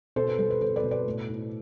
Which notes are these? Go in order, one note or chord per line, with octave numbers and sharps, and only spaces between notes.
B2 A4 C5
B4
G3 A4
B4
B2 A4 C5
B4 D5
B2
B4 D5
A2
E4